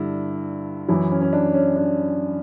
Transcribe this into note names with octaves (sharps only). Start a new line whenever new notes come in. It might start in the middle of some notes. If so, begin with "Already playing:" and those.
Already playing: G2 D3 E4
F#2 E3 E4
C#4
C#4
D4
C#4
D4